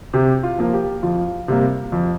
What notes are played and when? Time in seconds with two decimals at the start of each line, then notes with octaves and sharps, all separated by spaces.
0.13 C3 G4
0.43 F4
0.58 F3 A#3
0.73 G4
1.03 F2 F4
1.48 C3 G3 A#3
1.92 F2